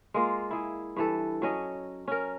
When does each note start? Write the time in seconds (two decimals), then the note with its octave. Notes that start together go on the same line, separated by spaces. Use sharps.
0.14 G#3 A#3 F4
0.51 E4 G#4
0.96 G2 E3 A4
1.42 F#3 C#4 D#5
2.08 C#4 A#4